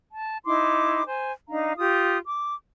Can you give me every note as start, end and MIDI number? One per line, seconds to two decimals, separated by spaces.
0.11 0.37 81
0.45 1.03 63
0.45 1.03 64
0.45 1.03 84
0.45 1.03 86
1.05 1.32 72
1.05 1.32 80
1.47 1.73 62
1.47 1.73 63
1.47 1.73 77
1.47 1.73 82
1.78 2.18 65
1.78 2.18 67
1.78 2.18 87
2.26 2.54 86